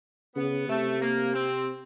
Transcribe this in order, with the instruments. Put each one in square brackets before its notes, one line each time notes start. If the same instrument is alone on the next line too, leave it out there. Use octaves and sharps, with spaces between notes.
[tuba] C#3 [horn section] B3
[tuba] C3 [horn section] A3
[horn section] A#3
C4